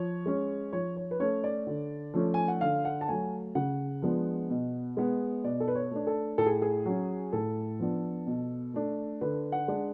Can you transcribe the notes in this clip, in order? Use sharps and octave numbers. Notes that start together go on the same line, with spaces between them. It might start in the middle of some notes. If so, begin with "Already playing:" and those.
Already playing: F3 C#5
G#3 C#4
F3 C#5
C#5
B4
A3 C#4 C#5
D5
D3
F3 A3 C#4
G#5
F#5
D3 F5
F#5
A5
F#3 A3 G#5
C#3 F#5
F3 G#3 B3 D4
B2
G#3 B3
B2 D5
A4
B4
C#5
A3 D4
A4
A2 A4
G#4
G#4
F#3 C#4
A2 A4
F3 B3 D4
B2
A3 D4
D3 B4
F#5
G#3 D4